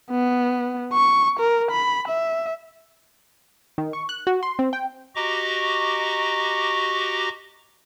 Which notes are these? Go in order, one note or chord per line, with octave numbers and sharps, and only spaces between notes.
B3
C#6
A#4
B5
E5
D#3
C#6
F#6
F#4
C6
C4
G5
F#4 G4 D#5 A#5 C#6 D6